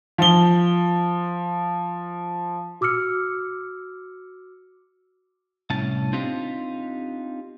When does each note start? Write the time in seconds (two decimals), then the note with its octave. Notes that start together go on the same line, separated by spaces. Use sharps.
0.18 F3 G7
2.81 F#4 D6 E6 F6 C#7
5.70 C2 A2 C#4 A5
6.13 C4 D4 D#4 F4 G4